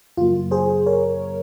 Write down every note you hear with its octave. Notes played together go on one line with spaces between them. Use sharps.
F#2 C#3 F#3 A#3 F4
G#4 C5
A#4 C#5